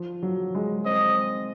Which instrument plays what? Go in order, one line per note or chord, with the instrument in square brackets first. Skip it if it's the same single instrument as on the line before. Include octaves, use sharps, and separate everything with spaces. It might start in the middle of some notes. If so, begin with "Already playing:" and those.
Already playing: [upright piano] F3
F#3
G#3
[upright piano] C4 [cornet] D#5